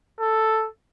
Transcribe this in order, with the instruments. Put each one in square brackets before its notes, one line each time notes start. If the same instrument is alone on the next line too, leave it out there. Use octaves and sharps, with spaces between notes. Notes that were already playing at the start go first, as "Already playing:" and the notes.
[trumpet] A4